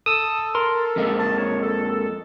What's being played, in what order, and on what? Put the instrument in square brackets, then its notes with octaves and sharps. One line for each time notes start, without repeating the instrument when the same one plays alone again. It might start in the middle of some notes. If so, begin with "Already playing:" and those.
[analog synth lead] A4 [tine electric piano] D#6 E6
[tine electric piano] A#4 [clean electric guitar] C6
[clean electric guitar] F2 G#3 A#3
[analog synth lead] A5
C#5
A4